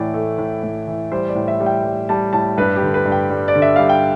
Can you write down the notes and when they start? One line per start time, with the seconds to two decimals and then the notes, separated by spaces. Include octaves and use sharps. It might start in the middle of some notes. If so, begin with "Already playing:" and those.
Already playing: A2 E3 D5
0.14 A3
0.38 A2
0.63 A2
0.87 E3
1.12 G3 C5
1.29 D5
1.35 A2
1.48 E5
1.60 G3
1.66 G5
1.85 G3
2.09 G3 A5
2.33 A2 A5
2.58 G2 B4
2.76 G4
2.82 D3
2.94 B4
3.06 G2
3.12 G5
3.30 G3
3.48 D5
3.55 D3
3.62 E5
3.76 G3 F5
3.89 G5